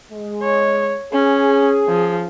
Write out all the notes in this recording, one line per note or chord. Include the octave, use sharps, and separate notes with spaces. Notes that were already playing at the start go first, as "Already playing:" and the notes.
G#3
C#5
C#4 G#4
F3